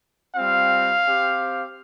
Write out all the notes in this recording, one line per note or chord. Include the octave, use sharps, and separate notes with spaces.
G3 C4 F4 F5
C4 G4